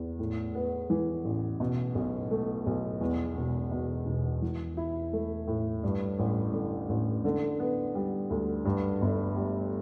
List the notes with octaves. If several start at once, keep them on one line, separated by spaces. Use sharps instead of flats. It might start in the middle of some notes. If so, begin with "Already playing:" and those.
Already playing: E2
A2
B3
E3
A1
B2
B1
A3
B1
E2
E1
B2
E1
E3
E4
A3
A2
G2
A1
D3
A1
D3
B3
G3
D2
G2
G1
G3